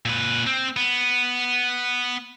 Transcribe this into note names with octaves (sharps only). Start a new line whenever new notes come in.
A#2 B4
C4
B3